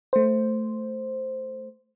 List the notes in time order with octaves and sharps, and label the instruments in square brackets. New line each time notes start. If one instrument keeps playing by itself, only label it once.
[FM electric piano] A3 C5